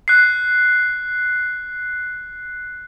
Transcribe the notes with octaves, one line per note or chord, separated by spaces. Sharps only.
F#6 C7